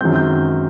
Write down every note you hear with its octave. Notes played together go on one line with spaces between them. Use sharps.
F#2 D#3 G#3 C4 G6
G6